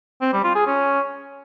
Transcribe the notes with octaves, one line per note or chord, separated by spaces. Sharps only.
C4
G3
F4
G#4
C#4